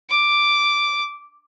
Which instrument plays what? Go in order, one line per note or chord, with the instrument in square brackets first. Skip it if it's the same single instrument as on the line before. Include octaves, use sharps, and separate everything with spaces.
[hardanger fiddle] D6